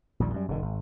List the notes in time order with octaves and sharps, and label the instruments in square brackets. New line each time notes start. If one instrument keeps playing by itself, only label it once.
[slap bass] A#1 D#2 A#2 G3
F#2 G3
F1 G2 D3 D#3
G#1